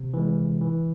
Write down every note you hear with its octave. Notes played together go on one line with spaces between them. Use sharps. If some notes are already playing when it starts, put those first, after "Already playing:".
Already playing: C3
E3 G#3
E3